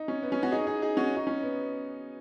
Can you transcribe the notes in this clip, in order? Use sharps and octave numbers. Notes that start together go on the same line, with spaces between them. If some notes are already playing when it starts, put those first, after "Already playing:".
Already playing: D#4
C#4
B3
C#4
C#4 F#4
D#4 G#4
D#4 G#4
D#4 G#4
C#4 F#4
D#4
C#4
B3